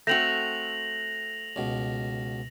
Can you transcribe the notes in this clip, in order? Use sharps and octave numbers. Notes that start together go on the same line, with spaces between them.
A3 C4 F#4 A#6 F7 F#7
C#2 B2